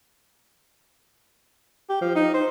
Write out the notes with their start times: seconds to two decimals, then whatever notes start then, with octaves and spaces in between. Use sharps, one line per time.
1.89 G4
2.01 F3
2.15 D#4
2.34 C5